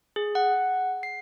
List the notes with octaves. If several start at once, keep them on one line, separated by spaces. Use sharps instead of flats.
G#4
F#5
C7